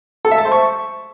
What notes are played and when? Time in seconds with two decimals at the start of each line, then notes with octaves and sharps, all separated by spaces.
0.25 A4
0.31 E5
0.38 A5
0.45 C5
0.52 C#6